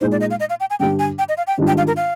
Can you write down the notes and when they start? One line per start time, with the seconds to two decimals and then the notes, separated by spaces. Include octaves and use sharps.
0.01 A#2 G#3 D#4 C5
0.12 D5
0.21 D#5
0.31 F5
0.40 D#5
0.50 F5
0.60 G5
0.70 G#5
0.80 G2 D3 G3 D4 G5
0.99 G#5
1.18 G5
1.29 D#5
1.37 F5
1.47 G5
1.58 G#2 D#3 G3 D4 F4
1.67 G5
1.78 F5
1.87 A#4
1.97 F5